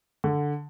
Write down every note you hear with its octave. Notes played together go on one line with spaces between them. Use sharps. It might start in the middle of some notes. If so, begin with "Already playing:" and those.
D3